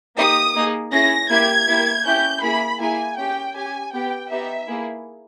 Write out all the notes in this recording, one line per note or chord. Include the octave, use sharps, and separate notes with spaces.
A#3 D#4 G4 D#6
A#3 D#4 G#4
C#4 E4 G#4 A#6
A#3 E4 G4 G#6
A#3 E4 G4
C#4 E4 G4 G6
A#3 E4 G#4 B5
A#3 E4 G#4 G#5
C#4 G4 G5
C#4 G4 G#5
B3 G4 G5
B3 D#4 G4 E5
A#3 E4 G#4